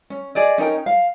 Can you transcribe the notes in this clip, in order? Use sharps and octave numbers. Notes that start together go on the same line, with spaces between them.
C#4
G#4 D5 D#5
C#4 D#4 A#4 G5
F5